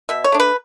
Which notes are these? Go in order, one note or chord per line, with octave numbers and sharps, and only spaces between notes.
B2 E5
C#5
A3 D4
B4